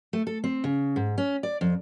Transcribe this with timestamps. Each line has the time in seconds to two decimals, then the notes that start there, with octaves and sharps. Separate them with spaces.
0.13 A3
0.27 A4
0.44 C4
0.64 C#3
0.96 G#2
1.18 C#4
1.43 D5
1.61 F2